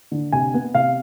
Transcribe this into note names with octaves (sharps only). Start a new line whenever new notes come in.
D3
C3 G#5
B3
C3 F5